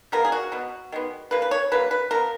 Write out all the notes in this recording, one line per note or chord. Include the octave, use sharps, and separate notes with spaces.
C#3 F3 B3 A#4
G#4
F#4
B2 F#3 B3
D#3 G#3 B3
C#3 F3 A#3 B4
B4
C#5
C#3 F#3 A#3 B4
B4
F3 B3 A#4